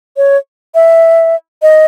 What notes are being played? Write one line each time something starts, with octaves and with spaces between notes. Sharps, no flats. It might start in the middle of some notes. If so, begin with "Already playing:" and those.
C#5
E5
D#5